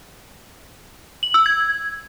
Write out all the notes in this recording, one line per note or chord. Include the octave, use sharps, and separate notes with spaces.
F#7
E6
G#6